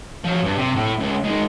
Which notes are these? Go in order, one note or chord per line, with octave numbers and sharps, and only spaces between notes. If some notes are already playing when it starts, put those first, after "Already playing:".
F3 F#3
G2
C3
A2
C#2
D#3 G#3